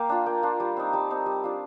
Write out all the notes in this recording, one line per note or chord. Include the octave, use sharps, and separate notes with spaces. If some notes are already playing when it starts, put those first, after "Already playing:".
Already playing: A#3 F5 G5
D4 F4
A#3 G5
D4 F4
G3
C4 D#4
G3 A5
C4 D#4
G3
D4 F4